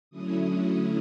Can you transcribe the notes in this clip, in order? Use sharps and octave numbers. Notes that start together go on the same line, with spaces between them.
D3 F#3 A3 C#4 E4 D#6